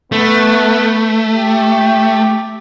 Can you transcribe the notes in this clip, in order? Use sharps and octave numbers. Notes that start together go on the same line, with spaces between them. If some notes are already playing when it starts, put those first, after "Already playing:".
A3 B3
G4